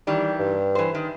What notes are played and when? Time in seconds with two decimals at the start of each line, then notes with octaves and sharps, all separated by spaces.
0.07 D#3 E3 G3
0.39 G2
0.75 E3 C5
0.95 D#3